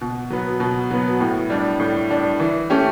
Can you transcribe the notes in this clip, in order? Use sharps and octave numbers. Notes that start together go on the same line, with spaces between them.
B2
F#3 B3
B2
F#3 B3
A2
G3 D4
A2
G3 D4
E3
A3 C#4 G4